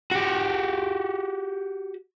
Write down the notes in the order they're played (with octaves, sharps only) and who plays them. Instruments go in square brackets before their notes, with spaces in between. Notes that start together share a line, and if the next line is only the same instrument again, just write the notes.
[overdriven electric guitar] F#4 G4